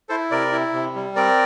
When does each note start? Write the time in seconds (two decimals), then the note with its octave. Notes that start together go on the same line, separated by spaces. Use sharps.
0.09 E4 A4 C5
0.31 C3 A#4 D5
0.52 E4
0.74 C3
0.95 G3
1.16 C4 A#4 D5